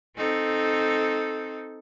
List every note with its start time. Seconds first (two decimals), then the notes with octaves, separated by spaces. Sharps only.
0.17 C4 D#4 A4